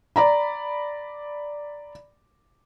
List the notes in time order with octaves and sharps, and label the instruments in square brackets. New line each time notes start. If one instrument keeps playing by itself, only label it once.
[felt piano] D5 A#5 B5